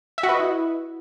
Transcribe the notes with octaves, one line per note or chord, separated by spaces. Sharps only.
E5
F#4
B4
D#5
E4